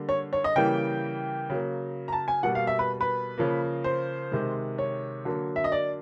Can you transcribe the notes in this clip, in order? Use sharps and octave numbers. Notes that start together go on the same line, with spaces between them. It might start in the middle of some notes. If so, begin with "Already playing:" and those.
Already playing: D3 G3 A#3
C#5
C#5
D#5
C#3 E3 G3 A#3 G5
C#3 F#3 A#3
A#5
A5
G#5
B2 G3 A#3 F#5
F5
E5
B4
B4
C#3 F3 A#3
C5
C3 D#3 G#3
C#5
D3 F#3 A#3
E5
D#5
D5